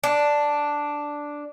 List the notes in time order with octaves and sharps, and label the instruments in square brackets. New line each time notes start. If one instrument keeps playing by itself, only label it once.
[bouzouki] D4